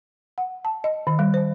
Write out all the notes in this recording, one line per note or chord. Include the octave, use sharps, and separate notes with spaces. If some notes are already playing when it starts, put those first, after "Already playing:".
F#5
A5
D#5
D#3
G3
C5